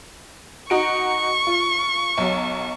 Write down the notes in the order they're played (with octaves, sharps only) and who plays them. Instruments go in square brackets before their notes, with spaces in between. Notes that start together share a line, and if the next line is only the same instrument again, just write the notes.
[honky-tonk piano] D#4 F#4 D7 [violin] C#6
[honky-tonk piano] F4
B1 F#3